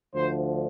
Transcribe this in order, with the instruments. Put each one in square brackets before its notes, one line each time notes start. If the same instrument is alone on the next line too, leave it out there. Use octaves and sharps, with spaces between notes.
[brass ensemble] D2 D3 F3 C5